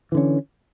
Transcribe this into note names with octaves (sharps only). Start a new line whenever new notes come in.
D3 E3 C#4